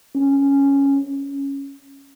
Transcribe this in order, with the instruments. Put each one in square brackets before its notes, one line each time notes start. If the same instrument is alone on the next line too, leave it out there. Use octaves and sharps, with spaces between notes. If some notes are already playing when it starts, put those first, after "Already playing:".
[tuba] C#4